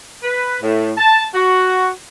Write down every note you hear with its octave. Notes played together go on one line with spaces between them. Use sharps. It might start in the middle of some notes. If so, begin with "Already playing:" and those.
B4
A2
A5
F#4